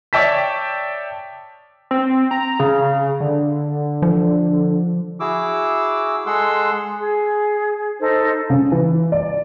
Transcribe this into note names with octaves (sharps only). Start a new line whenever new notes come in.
C#5 D5 E5 G5 A5 B6
C4
A#5
C#3
D3
F3
E4 F#4 G#4 D6 E6
G#3 G#4 A4 F#5 C6 E6
G#4
D#4 A4 C5
C#3
E3
D5